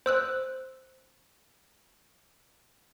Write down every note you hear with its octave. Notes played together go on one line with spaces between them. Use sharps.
C5 E6 F#6